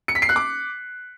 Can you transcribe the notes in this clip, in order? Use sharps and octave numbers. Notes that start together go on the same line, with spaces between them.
C#7
B6
C7
F#6
D6